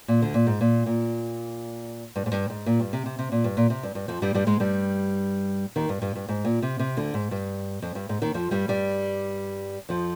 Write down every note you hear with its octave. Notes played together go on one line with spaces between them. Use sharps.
A#2
D2 D3
A#2
G#2
A#2
A#2
G2
G#2
G2
G#2
A#2
G2
C3
C3
C3
A#2
G2
A#2
C3
G2
G2
F2 F3
G2 G3
G2 G3
G#2 G#3
G2 G3
D#2 D#3
G2
G2
G2
G#2
A#2
C3
C3
D2 D3
G#2
G2
F2
G2
G#2
D#2 D#3
F2 F3
G2 G3
G2 G3
F2 F3